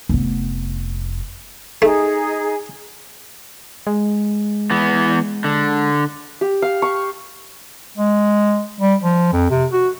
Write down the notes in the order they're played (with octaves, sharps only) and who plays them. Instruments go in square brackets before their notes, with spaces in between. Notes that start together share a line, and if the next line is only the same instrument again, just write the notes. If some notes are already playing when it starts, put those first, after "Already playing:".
[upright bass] F1 B3
[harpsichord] A3 [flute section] D#4 G#4
[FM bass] G#3
[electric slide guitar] E3 B3
D3
[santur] G4
F5
C#6
[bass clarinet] G#3
G3
F3
F2
C3
F#4